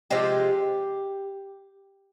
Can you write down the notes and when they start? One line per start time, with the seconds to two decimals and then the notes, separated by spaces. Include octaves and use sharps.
0.10 C3 F3 G#3 G4